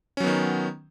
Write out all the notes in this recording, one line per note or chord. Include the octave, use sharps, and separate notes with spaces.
D#3 F#3 B3 C#4